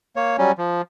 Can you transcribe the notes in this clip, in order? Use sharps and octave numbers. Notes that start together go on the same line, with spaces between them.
A#3 C#5
F#3 G3 C#4
F3